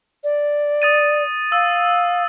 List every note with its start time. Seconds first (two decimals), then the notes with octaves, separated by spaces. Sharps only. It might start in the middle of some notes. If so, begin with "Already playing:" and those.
0.24 D5
0.82 D#6 A6 D#7
1.52 F5 E6